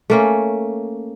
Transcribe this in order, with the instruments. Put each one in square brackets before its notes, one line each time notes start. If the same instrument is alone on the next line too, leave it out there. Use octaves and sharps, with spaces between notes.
[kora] A3 A#3 C#4